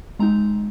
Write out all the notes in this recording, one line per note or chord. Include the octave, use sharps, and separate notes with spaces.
G#3 C4 D#4 A#5